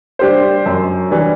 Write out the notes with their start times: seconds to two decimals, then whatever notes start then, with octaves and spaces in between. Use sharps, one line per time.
0.19 G3 D4 G4 C5
0.66 F#2
1.11 E3 G3 D4